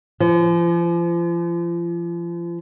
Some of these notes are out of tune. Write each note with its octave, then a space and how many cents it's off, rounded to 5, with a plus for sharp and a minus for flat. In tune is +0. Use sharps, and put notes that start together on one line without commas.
F3 -35